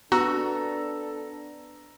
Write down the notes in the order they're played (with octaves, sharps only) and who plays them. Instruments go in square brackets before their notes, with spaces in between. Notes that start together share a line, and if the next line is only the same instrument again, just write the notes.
[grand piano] B3 [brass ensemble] D4 A4 [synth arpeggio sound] F#4 [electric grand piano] A#5 E6